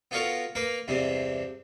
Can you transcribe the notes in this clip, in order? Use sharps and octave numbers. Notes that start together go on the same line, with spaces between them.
B3 F4 F#4 A4 A#4 C#5
A#3 A#4 B4
E2 G2 C3 C4